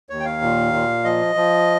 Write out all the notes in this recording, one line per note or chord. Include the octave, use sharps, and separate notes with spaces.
D#2 C#5
G5
F5
A#2
A#2
F3 D#5
F3